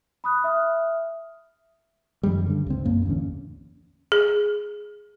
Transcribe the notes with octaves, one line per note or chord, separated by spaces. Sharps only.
B5 D#6 F#6
E5 D#6 F6
F#2 D#3 F3 G3
G2 D3
C#2 C4
B1 F#2 A#3
A1 E2 D3 C#4
G#4